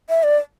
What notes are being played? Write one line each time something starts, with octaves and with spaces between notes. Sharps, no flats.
E5
D5